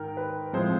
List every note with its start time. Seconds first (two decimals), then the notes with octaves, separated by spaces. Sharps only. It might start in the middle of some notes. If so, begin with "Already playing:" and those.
Already playing: G#2 D#3 A#4 G5
0.17 B4
0.53 A2 F3 G#3 C4 C5